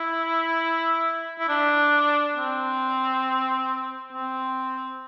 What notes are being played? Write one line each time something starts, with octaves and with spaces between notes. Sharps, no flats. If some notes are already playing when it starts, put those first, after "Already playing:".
Already playing: E4
E4
D4
C4
C4